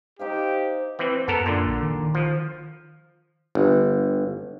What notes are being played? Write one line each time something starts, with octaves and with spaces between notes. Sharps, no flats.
D#4 G4 C5 F5
E3 C4
F#2 B3 A4 A#4
A#2 D3
A#1
D#3
F3
G1